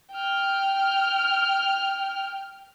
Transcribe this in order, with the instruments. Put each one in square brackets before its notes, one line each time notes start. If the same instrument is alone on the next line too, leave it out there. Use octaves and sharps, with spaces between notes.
[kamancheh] G5 F6